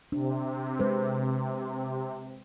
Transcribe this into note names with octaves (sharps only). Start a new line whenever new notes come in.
C3 D4
G#3 B4 C5